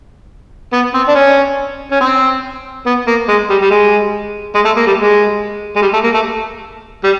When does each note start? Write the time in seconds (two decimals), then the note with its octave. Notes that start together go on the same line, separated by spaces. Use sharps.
0.73 B3
0.94 C4
1.08 D4
1.15 C#4
1.91 C#4
2.01 C4
2.86 B3
3.07 A#3
3.28 G#3
3.50 G3
3.61 G3
3.71 G#3
4.55 G#3
4.65 A3
4.77 A#3
4.87 G3
4.98 G#3
5.76 G#3
5.82 G3
5.93 A3
6.04 A#3
6.14 A3
7.04 G3